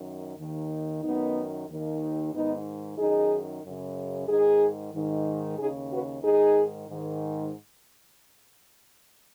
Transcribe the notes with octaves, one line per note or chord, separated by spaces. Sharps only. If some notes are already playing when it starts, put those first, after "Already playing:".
Already playing: F#2 D#3
D#2 D#3
F#2 D#3 B3 D#4
D#2 D#3
G#2 D#3 B3 D#4
F#2 D#3 D#4 G#4
F#2 C#3
G#2 D#3 D#4 G#4
G#2 D#3
D#2 C#3 D#4 G#4
F#4 B4
G#2 D#3 D#4 G#4
G#2 D#3